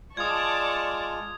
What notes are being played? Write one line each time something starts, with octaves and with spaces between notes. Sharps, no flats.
G#3 F4 D5 A5 C#6 D#6 G#6